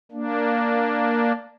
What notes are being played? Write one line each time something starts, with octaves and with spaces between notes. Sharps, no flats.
A#3 D4